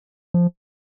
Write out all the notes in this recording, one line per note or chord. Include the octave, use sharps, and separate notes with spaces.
F3